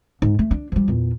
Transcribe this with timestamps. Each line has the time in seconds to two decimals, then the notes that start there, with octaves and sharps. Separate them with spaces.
0.22 G#2
0.39 A3
0.51 D4
0.72 F3 G3
0.88 E2 A#2